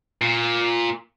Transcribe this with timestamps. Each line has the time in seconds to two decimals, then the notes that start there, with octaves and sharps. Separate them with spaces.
0.22 A#2